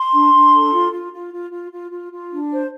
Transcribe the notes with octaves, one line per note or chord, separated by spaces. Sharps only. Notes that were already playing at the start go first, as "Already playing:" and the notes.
Already playing: C6
D4
D4
A4
F4
F4
F4
F4
F4
F4
F4
F4
D4
C5